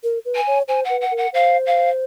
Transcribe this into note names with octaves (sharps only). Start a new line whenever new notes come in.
A#4
B4
G#5
C#5
C5 G#5
F#5
B4
F#5
A#4
F#5
C5 F5
F5